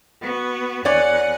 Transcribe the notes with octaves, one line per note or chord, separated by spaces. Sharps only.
B3 F#4
E2 C#5 D5 F#5 G#5